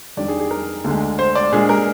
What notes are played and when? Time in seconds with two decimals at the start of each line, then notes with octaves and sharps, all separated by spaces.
0.17 F2 D#3 G3 D4 D5
0.28 G#4
0.40 G#4
0.51 A#4
0.84 D2 D3 G#3
1.19 C5
1.35 D5
1.52 A#2 G#3 D4 G#4
1.69 A#4